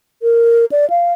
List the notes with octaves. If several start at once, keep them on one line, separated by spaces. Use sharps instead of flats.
A#4
D5
F5